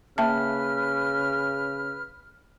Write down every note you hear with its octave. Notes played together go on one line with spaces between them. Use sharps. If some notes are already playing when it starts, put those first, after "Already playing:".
C#3 A#3 B4 E5 A5 F6